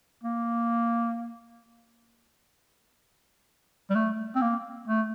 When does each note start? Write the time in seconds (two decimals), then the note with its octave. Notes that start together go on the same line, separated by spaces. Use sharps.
0.24 A#3
3.90 G3
3.95 A3
4.35 C4
4.41 A#3
4.88 A3